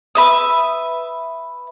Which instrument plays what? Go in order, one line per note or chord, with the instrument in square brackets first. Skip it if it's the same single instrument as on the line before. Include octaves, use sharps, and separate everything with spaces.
[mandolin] B4 E5 D#6